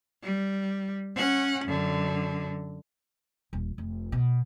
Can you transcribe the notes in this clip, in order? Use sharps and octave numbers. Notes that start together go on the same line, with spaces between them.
G3
C#4 F#5
F#2 D3
D#1
F1
B2